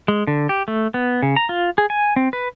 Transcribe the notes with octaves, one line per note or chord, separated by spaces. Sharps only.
G#3
D3
G4
A3
B3
C#3
A#5
F4
G#4
G#5
C4
B4